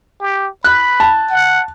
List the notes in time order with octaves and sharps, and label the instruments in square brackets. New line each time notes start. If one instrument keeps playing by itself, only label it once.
[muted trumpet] G4
[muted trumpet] B5 [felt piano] F#6
[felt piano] A5
[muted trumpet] F#5